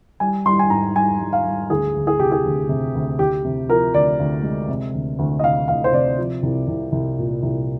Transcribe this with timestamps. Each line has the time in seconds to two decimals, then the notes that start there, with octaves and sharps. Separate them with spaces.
0.20 G3 G#5
0.46 G3 C6
0.59 G#5
0.70 G#2 A#5
0.95 G3 G#5
1.20 G3
1.33 F5
1.45 G3
1.70 D2 G#4
1.95 D2
2.07 G#4
2.19 C3 G4
2.32 G#4
2.45 D2
2.69 C3
2.95 D2
3.19 D2 G4
3.45 C3
3.69 F3 A#4
3.94 D2 D5
4.19 D2
4.43 G#3
4.69 C3
4.93 D2
5.19 D2
5.39 D#5
5.44 C3 F5
5.68 D2 F5
5.84 C5
5.93 C3 D5
6.18 F3
6.43 C2
6.68 C2
6.92 C2
7.18 A#2
7.43 C2